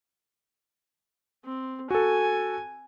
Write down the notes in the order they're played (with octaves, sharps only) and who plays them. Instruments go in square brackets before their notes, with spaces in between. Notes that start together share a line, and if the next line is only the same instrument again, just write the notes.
[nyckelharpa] C4
[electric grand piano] F#4 A4 [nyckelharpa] G#5